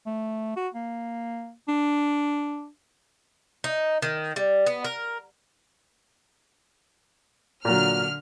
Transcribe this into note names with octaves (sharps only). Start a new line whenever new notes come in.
A3
F#4
A#3
D4
D#4
D#3
G3
B3
A#4
A#2 D3 F#3 F6